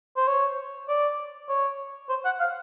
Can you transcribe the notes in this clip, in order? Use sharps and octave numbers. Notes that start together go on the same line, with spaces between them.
C5
C#5
D5
C#5
C5
F#5
F5